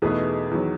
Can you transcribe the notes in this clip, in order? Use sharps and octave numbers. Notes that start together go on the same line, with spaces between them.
E2 B2 A3 D#4 G#4 B4
E2 D#3 F#3